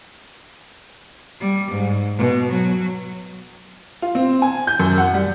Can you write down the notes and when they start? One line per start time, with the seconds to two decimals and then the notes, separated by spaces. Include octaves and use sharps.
1.40 G3
1.71 G#2
2.18 B2
2.52 F#3
4.02 F4
4.15 C4
4.42 G#5
4.67 G6
4.80 F#2
4.98 F#5
5.14 G3